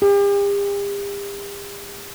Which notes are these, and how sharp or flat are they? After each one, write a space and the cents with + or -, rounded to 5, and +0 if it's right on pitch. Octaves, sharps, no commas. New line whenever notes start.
G4 +45